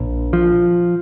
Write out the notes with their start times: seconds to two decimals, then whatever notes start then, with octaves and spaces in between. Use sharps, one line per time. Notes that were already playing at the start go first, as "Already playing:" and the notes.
Already playing: A#1
0.33 F3